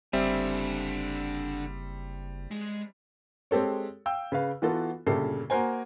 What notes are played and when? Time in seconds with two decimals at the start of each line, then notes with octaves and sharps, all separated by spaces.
0.13 F#1 D3 G3 C4 E5 G#5
2.51 G#3
3.51 G#3 C4 G4 A4 C#5
4.06 F5 G5 E6
4.32 C#3 B4 F5
4.62 E3 B3 F4 F#4 A4
5.07 G1 A#2 C#3 G4 A4 C7
5.50 A#3 F#4 A#4 C5 G#5